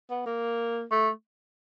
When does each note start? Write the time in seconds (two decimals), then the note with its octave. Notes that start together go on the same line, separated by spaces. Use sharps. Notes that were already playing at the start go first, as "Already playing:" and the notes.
0.10 B3
0.26 A#3
0.91 A3